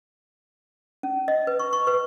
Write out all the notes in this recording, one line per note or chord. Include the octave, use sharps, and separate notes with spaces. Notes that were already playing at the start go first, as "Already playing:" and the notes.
C#4
D#5
B4
C#6
C#6
B4